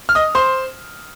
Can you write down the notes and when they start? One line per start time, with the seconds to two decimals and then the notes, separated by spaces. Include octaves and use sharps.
0.09 F6
0.15 D#5 D#6
0.35 C5 C6